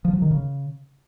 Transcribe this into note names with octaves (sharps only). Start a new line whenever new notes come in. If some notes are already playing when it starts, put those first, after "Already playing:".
F3
F#3
D#3
C#3